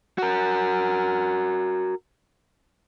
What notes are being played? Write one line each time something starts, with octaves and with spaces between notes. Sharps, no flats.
F#4 A#4